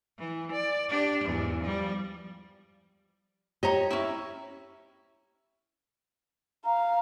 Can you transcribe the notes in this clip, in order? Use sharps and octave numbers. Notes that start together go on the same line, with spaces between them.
E3
D5
D4 G4
E2 G#2
F3 G3
G4 C#5 D#5 A#5
C#4 E4
F5 A#5